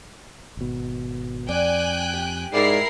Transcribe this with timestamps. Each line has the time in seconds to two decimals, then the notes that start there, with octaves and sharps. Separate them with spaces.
0.57 G#1 B2
1.49 F2 D5 G5 G#5 F#6
2.13 G4
2.53 G#2 E4 A#4 D5 C7